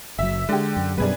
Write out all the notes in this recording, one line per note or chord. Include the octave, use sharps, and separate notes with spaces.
F#1 F#3 E5
D3 G#3 G4
F#2
F#2 B2 G3 D4 G#4 B4